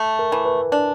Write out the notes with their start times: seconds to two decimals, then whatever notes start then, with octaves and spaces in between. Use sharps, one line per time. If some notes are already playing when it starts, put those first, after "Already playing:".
Already playing: A3
0.19 A#4
0.32 E3
0.46 B4
0.72 D4